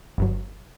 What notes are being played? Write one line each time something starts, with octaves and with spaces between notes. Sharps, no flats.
G1 G2 F#3